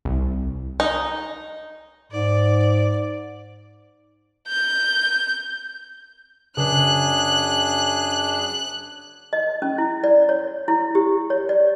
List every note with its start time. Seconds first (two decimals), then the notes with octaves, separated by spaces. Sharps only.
0.05 C2
0.80 D#4
2.12 G#2 D5
4.48 G6
6.57 F#2 C#3 D4 G#4 F#6
9.33 D#5
9.62 C#4
9.78 E4
10.04 D5
10.29 C#5
10.68 E4
10.95 G4
11.30 C#5
11.49 D5